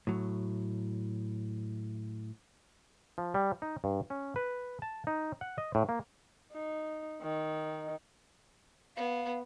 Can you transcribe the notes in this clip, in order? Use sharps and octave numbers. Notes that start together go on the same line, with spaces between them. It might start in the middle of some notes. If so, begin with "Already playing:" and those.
A2 F#3
F3
G3
D#4
G2
C#4
B4
A5
D#4
F#5
D#5
A2
A#3
D#4
D#3
B3 F5